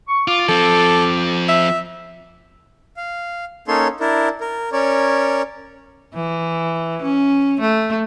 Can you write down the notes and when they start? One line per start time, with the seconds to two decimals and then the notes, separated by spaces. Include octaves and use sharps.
0.08 C#6
0.28 F4 D6
0.49 F3 C4 A4
1.49 E5
2.97 F5
3.68 A#3 C#4 D#4 A4 C#5 C6
4.00 D4 E4 A#4
4.41 A#4
4.73 C#4 A#4 C#5 D5
6.14 E3
7.02 C#4
7.61 A3